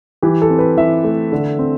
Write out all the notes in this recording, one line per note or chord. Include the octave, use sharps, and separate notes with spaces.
E3 G4
A4
C4
B4
E3 E5
A3
D3
C4